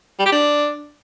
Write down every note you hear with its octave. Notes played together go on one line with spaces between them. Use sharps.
G3
G4
D4